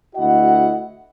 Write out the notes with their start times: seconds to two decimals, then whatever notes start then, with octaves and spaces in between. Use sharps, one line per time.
0.16 D2 E4 F#4 D#5 F#5